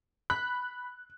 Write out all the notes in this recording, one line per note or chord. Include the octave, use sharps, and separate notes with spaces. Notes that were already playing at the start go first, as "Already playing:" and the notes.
B5 F#6